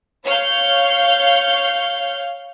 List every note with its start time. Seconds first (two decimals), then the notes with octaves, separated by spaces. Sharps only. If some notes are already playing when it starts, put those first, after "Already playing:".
0.24 C#5 F5 F6 G6